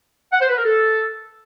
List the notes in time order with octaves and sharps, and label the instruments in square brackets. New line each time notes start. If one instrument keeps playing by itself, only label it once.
[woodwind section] F#5
C5
B4
A#4
A4